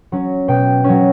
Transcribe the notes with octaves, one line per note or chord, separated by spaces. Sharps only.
F#3 C#4
B2 G5
F#3 C#4